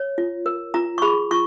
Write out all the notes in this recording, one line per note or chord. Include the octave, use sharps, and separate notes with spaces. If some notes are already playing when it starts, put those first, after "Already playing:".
Already playing: C#5
F4
A#4
F4 A#5
C#6
G#4 B5
F4 C#6